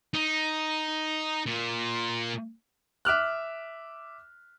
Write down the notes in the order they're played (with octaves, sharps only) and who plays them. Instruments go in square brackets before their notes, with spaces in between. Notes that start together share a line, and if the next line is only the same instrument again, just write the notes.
[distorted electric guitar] D#4
A#2
[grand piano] E5 D6 F6 F#6